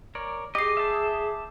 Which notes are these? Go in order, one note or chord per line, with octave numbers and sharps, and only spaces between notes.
A#4 C#5 D5
G4 G#4 D#5 D6 C7
E5 G5 A5